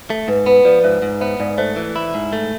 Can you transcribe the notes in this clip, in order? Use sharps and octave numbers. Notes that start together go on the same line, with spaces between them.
A3 A4
G#2 B4
B3 B4
F3 B4 D5
G#2 C5 E5
G#2
B3 C5 E5
G#2 D5 F5
A3 C5 E5
E3 A4
E4
G#2
A3